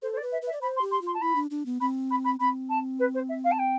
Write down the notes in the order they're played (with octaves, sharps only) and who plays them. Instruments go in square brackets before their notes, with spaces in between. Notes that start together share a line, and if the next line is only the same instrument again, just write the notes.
[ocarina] A4 [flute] C5
[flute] C5
D5
[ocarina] B4
[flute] E5
[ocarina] B4 [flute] E5
[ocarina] D5
[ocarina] C5 [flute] B5
[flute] C6
[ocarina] G4
[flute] C6
[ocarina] F4
[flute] C6
A5
[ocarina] E4 [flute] B5
[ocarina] D4
D4
B3
[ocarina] C4 [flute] B5
[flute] B5
B5
[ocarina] C4 [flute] B5
[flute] A5
B4
C5
E5
F5
A5
G5